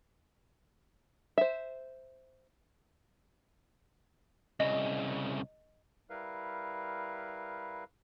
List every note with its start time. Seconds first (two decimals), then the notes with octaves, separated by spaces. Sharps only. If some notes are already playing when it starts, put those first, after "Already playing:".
1.38 C5 E5
4.60 C2 C#3 D#5
6.10 G3 E4 A#4 B4 F5